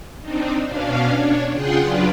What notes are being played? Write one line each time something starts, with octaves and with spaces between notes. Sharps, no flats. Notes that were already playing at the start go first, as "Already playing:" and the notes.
C4 D4 D#4
B2 C#4 D4 F5
D4 C#5
C#3 F4 G#4 F#5 G5 C6
F#3 D4 F4 B4 D5